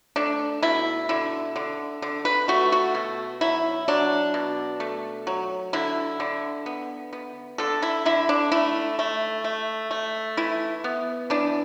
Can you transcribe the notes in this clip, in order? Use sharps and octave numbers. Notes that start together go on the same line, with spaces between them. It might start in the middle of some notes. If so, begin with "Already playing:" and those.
A3 D4
B2 E4
D3 E4
D3
D3
B4
A3 F#4
F#4
B2
F#3 E4
F#3 D4
B2
A3
F#3
D3 E4
D3
B3
B3
D3 A4
E4
D3 E4
D4
A3 E4
A3
A3
A3
E3 E4
B3
E3 D4